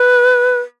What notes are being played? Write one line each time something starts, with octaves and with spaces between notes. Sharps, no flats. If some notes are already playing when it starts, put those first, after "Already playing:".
Already playing: B4